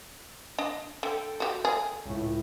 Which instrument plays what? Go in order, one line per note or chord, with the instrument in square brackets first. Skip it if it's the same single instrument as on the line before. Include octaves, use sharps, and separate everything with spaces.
[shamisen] D4 D#5
[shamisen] D3 [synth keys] A4 G5
[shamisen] F#4 G4
G#4
[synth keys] C#2 A2